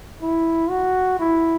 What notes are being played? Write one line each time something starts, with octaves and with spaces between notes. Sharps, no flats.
E4
F#4
E4